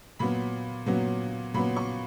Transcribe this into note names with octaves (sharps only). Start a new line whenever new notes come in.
A#2 F#3 B3 B5
A#2 F#3 B3
A#2 F#3 B3 B5
C#6